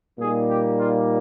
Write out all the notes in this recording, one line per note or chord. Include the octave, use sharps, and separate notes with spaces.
A#2 G3 A#3 D#4 G#4
G4
F4